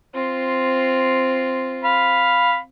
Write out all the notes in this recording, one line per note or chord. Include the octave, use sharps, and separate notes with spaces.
C4 F4
F5 B5